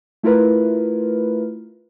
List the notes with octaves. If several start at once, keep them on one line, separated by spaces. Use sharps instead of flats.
A3 E4 F4 A#4 B4